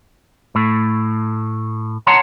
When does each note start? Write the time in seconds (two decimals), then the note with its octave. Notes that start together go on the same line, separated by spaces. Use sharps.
0.55 A2 A3
2.07 C#5 F#5 A5 A#5 C6